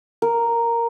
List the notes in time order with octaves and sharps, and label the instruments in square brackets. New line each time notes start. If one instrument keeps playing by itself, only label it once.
[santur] A#4